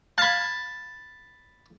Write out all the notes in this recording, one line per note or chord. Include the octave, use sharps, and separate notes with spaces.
F5 A5 B5 G#6